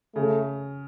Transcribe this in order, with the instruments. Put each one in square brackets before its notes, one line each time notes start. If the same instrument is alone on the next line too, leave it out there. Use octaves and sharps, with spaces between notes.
[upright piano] C#3 [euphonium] A3